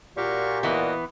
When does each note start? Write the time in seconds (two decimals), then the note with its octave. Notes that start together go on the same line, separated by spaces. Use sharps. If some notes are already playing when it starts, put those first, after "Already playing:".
0.17 A#2 F#4 G4 F5 C#6
0.63 E3 A#3 B3 F#4 D#5